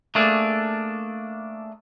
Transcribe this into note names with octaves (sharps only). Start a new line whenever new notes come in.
A3 A#3 D4 G#4 A4